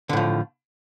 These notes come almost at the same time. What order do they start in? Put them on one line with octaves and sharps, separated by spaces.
D3 A2 F3